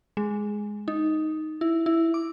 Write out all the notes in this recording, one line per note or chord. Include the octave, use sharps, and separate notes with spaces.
G#3
D#4
E4
E4
D6